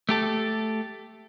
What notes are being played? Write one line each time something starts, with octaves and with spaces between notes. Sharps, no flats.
A3 G4 A4